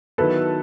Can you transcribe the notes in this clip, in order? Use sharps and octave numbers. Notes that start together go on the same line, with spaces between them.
D#3 F#3 B3 E4 A4 B4